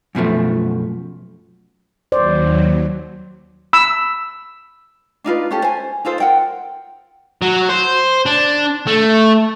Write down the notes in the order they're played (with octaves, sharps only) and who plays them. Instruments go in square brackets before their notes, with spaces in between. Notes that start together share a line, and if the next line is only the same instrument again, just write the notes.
[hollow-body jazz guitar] F#2 B2 F3 A3
[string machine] D#2 F#3 [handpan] C5 D5
[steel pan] B5 E6
[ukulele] D4 D#4 F4 B4
C#4 G4 A4
C5 G#5
D#4 F4 A4 C5
A#4 F#5 G5
[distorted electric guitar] F#3
C5
D4
A3